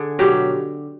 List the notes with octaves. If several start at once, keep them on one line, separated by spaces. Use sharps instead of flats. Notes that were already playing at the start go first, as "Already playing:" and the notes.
Already playing: D3 G#4
B2 F#3 G4